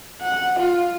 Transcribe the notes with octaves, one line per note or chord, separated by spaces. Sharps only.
F#5
F4